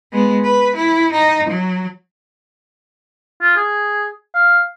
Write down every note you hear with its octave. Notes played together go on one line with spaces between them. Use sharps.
G#3 B3
B4
E4
D#4
F#3
F4
G#4
F5